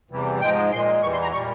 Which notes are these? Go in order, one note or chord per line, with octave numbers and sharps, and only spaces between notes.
E2 C3 E3 G3
G#2 F3 G#3 G5
A#2 G#3 C6
E2 E3 G3 C#6
C6
A#5
A#2 G3 C#6